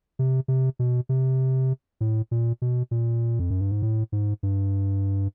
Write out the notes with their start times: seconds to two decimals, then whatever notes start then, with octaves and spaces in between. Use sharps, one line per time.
0.19 C3
0.48 C3
0.79 B2
1.09 C3
2.01 A2
2.31 A#2
2.62 B2
2.91 A#2
3.39 F2
3.50 F#2
3.61 G2
3.71 G#2
3.82 A2
4.12 G#2
4.43 G2